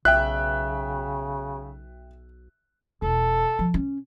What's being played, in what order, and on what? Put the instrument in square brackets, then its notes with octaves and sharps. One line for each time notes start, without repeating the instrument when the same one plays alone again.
[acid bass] B1 [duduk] C#3 [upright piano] E5 G5 [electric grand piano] F#6
[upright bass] E1 [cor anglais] A4
[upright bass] F3
C#4